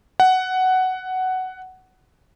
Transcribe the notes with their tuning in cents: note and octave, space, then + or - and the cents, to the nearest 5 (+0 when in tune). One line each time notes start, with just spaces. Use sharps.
F#5 +10